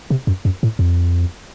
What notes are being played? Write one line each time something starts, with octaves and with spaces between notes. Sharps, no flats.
C3
F#2
F#2
A2
F2